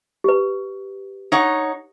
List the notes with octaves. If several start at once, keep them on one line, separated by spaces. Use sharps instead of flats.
G4 B4
D#4 C#5 F#5